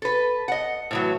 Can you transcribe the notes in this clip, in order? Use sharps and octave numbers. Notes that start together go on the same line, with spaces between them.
A4 B4
D#5 F#5
A2 E3 F#3